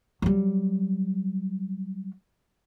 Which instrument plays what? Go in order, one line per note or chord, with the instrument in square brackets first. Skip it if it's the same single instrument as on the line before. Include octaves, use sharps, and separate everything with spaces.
[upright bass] F#3 G3